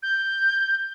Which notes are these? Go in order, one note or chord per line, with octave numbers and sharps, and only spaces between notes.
G6